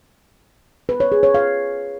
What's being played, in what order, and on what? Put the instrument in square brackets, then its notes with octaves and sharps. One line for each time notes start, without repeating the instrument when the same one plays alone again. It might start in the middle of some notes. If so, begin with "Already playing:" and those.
[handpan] B4
C#5
G#4
C#5
F5